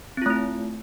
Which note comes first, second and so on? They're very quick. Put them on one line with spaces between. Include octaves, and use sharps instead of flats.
C4 F4 A3 E4